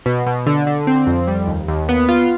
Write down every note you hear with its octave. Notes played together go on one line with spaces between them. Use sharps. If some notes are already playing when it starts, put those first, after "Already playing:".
B2
B2
D3
D3
C4
F2
G3
D#2
D#2
B3
F4